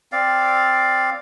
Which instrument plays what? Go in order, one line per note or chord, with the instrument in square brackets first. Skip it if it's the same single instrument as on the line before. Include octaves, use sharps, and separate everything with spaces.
[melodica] C4 D5 F5